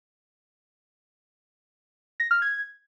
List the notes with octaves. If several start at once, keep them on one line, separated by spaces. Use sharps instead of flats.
A#6
F6
G#6